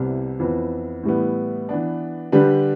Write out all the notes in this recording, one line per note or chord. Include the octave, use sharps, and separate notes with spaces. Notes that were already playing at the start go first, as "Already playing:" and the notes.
Already playing: C2 C3 G3 B3 E4
F2 E3 B3
A2 E3 G3 B3
E3 B3 D4
D3 G3 D4 G4 B4